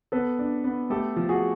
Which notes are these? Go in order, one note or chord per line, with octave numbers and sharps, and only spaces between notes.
B3 A4 B4
D4
B3
A3 G4 A4
F3
F#4 G#4